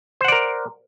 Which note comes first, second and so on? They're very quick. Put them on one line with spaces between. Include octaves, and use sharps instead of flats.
C5 F#5 D5 A#4